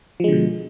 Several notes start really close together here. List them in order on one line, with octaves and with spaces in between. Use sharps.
F3 G#3 D3 B2